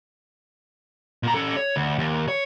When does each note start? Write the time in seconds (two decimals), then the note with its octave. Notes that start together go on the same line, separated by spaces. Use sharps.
1.23 A#2 A#5
1.34 C#4 A4
1.57 C#5
1.76 D2
1.98 D#2
2.28 C#5